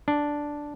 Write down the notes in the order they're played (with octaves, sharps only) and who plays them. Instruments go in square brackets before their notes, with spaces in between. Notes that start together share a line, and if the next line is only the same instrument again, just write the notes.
[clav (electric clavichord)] D4